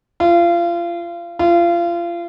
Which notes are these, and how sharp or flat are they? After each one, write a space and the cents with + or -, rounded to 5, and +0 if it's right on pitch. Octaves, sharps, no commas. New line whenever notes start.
F4 -30
F4 -30